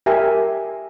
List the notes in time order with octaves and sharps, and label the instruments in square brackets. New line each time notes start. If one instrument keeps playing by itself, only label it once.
[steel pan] G4 A#4 E5 G#5